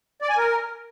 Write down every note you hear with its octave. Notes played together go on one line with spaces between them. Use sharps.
D5
G#5
A#4